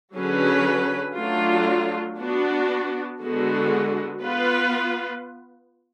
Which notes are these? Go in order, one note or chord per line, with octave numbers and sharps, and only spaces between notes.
D3 F#3 C#4 G#4 B4
F#3 A3 D4 F4
B3 D4 F#4
D3 G#3 B3 F#4
B3 F4 B4